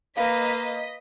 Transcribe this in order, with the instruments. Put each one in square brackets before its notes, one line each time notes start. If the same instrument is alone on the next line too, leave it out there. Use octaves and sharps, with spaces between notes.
[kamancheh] A#3 [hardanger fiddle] B4 [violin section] D#5 B6 [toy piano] F5